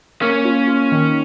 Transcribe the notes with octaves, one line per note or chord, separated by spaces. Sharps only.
A#3 C#4
F4
F4
D#3